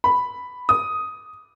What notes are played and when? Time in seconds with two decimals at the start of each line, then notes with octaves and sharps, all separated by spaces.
0.04 B5
0.69 D#6